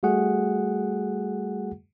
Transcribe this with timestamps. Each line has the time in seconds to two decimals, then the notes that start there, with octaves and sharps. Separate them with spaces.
0.03 G3 A3 F#4 G#4 F#5